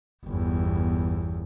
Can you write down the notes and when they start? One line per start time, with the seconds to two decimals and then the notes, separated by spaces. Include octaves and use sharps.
0.25 G1 E2